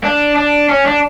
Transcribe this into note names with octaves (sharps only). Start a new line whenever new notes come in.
D4
D4
C#4
D4